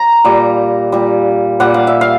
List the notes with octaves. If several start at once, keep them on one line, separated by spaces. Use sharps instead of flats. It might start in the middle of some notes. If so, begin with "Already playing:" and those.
Already playing: A#5
A#2 G3
A#2 G3
A#2 G3 F#5
F5
E5
F5